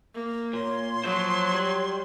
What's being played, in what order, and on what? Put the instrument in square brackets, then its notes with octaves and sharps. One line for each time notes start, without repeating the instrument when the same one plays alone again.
[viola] A#3
[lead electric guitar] A#2 [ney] C#5 [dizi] C6
[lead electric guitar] F3 C5 [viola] F#3 [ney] C#5
[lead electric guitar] G3